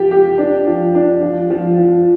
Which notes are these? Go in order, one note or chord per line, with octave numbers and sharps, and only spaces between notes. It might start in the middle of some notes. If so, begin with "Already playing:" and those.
Already playing: F3 G4
G4
D4
F3
D4
F3
F3
F3